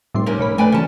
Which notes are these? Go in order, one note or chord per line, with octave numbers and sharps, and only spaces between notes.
F1 A2 G3 C6
C3 A#3 C#4 A#4
A#2 C#5 B5
A3 C4 B4 D5 G5 G#5
F#2 C#3 E3 C#4 A5